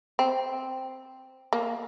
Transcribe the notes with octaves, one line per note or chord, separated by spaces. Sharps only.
C4
A#3